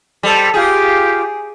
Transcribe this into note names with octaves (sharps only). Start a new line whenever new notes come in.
G3 A4 C5
F4 G4 G#4